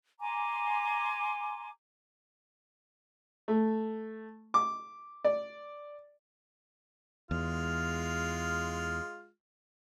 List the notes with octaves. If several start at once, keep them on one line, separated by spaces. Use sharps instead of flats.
G#5 A#5 C6 D6
A3
D6
D5
E2 G#3 F4 F6